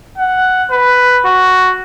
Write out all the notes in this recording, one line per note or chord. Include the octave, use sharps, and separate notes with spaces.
F#5
B4
F#4